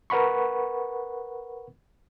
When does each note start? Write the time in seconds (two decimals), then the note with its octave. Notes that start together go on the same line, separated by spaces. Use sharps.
0.10 A#4 B4 F#5 B5 C#6